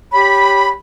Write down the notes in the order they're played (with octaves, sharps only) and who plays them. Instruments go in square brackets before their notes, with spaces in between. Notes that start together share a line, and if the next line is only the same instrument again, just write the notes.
[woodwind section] G4 C#5 B5